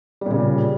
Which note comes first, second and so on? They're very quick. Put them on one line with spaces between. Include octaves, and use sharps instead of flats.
G3 A#2 C#3